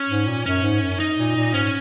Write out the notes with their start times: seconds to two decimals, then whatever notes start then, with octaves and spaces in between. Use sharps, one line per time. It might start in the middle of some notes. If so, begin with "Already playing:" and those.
Already playing: C#4
0.09 G#2
0.27 A#2
0.46 F#2 C#4
0.63 G#2
0.81 F#2
1.00 D#4
1.18 A#2
1.35 A#2
1.54 G#2 C#4